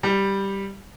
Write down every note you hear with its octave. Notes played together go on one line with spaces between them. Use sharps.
G3